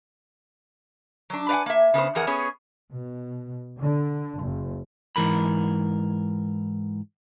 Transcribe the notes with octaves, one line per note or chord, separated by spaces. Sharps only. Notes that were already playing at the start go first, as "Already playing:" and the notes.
F#3 D4
B4 D5 F5 F#5 G#5
A#3 E5
C#3 B3 D4 C5
F2 E3 G#4 A#4 F#5
B3 C#4 G#4 C#5
B2
D3
F#1
G#2 E3 A#4 B5